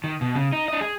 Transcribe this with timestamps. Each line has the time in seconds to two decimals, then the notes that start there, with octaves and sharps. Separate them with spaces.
0.04 D#3
0.21 B2
0.35 C#3
0.53 D#4
0.68 D4 D#5
0.81 G#4